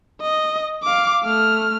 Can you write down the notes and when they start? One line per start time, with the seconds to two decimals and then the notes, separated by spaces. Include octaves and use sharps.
0.22 D#5
0.84 F5 D6
1.24 A3 F6